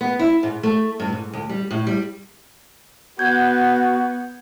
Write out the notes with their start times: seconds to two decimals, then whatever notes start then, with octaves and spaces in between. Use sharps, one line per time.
0.01 B3
0.19 E4
0.43 G#2
0.63 A3
1.00 G2
1.13 G#2
1.33 D2
1.49 G3
1.71 A2
1.87 G3
3.19 B3 F#4 G6 G#6